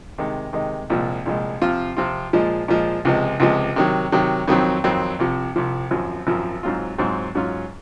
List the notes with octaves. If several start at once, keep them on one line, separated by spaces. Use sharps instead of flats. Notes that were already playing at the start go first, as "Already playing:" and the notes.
C3 D#3 G#3 D#4
C3 D#3 G#3 D#4
C2 A#2 F3 G#3
C2 A#2 F3 G#3
C3 F3 C4 F4
C3 F3 C4 F4
A#2 F3 G#3
A#2 F3 G#3
C#2 C3 F3 G#3
C#2 C3 F3 G#3
C3 D#3 F#3
C3 D#3 F#3
F2 D#3 F#3 C4
F2 D#3 F#3 C4
C2 C3 F3
C2 C3 F3
G#1 F#2 F3
G#1 F#2 F3
G#2 F#3 C4 F4
G#2 F#3 C4 F4
G#2 F#3 C#4 F4